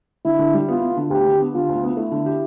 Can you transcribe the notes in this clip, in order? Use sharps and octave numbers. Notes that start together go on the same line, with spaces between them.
D3 E4
D3
G3
B3 F4
B3
D3
D2 G4
D3
B3
D3 F4
D2
B3
A3 E4
D3
G4